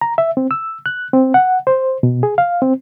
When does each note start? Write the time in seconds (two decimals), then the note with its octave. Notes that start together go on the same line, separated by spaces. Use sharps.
0.01 A#5
0.18 E5
0.37 C4
0.51 E6
0.86 F#6
1.13 C4
1.34 F#5
1.67 C5
2.03 B2
2.23 G#4
2.38 F5
2.62 C4